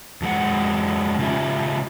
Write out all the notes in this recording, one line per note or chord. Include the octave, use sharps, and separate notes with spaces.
F2 F#3 G#3 F#5
C#3 C#4 F4 G4 E5